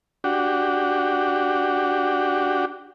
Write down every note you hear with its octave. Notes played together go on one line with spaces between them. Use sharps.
D4 F#4 G4